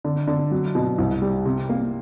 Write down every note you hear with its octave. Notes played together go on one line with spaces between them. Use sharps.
D3
D3
F#3
B2
C2
G3
C3
A#3